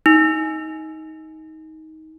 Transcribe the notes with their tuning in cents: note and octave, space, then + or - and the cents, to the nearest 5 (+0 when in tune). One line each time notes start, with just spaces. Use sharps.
D#4 +20